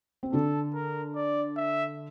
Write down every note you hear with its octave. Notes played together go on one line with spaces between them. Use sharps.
C4
D3 D4 A4
A#4
D5
E5